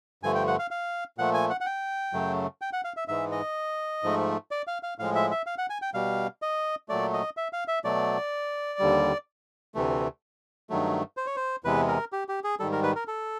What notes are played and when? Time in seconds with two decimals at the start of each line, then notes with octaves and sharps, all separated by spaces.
0.23 G2 D3 F3 A3 G#5
0.35 G5
0.47 F#5
0.59 F5
0.71 F5
1.18 A#2 F3 A3 F#5
1.34 G#5
1.50 F#5
1.61 F#5
1.66 G5
2.13 F#2 C#3 F#3 A3
2.61 G5
2.73 F#5
2.84 F5
2.97 E5
3.08 G#2 E3 G#3 E5
3.32 D#5
4.03 G#2 F3 A3
4.51 D5
4.67 F5
4.83 F5
4.98 A2 F3 G#3 F5
5.15 E5
5.31 E5
5.46 F5
5.58 F#5
5.70 G#5
5.82 G5
5.94 B2 G3 F5
6.42 D#5
6.89 A#2 F#3 A3 D5
7.13 D#5
7.37 E5
7.53 F5
7.68 E5
7.84 B2 F#3 A3 D5
8.79 D#2 D3 G3
9.75 D2 C3 E3 A3
10.70 G2 D#3 F#3 A3
11.17 C5
11.26 C#5
11.36 C5
11.64 E2 C3 E3 G#3 B4
11.88 A#4
12.13 G4
12.29 G4
12.44 G#4
12.60 G#2 D#3 G3 A4
12.72 A#4
12.83 B4
12.96 A#4
13.08 A4